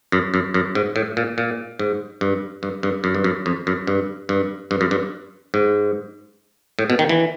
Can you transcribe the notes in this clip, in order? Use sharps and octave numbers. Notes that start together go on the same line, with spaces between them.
F#2
F#2
F#2
G#2
A2
A#2
A#2
G#2
G2
G2
G2
F#2
G2
F#2
F2
F#2
G2
G2
G2
F#2
G2
G#2
A2
B2
D#3
E3